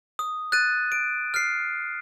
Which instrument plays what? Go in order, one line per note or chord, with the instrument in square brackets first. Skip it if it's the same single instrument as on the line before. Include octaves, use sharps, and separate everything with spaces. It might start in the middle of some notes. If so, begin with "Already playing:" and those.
[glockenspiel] D#6
F#6 A6 D#7
D7
F6 C7